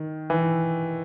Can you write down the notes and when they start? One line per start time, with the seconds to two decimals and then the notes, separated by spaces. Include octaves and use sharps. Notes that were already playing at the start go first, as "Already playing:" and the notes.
Already playing: D#3
0.30 E3